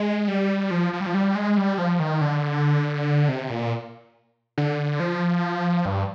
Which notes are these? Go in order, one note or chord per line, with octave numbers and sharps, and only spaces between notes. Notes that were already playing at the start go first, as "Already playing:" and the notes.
Already playing: G#3
G3
F3
F3
G3
F3
G3
G#3
G3
F3
D#3
D3
C3
A#2
D3
F3
G2